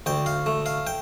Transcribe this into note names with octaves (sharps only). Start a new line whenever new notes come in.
D2 G5
F5
A3
F5
G5